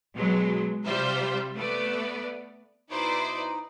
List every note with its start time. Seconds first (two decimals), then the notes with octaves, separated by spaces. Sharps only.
0.16 B2 F#3 G#3
0.85 C3 G3 F4 C5 E5
1.57 A3 B3 B4 D5
2.90 B2 D#4 E4 B4 C5 D5